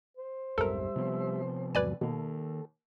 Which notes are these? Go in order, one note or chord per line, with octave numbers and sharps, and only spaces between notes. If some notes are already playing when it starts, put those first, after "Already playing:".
C5
B1 F2 G#2 G3 A4 A#4 E5
C3 F3 B3
E2 G#2 F#3 B4 D5 G#5
B2 D#3 A#3 A4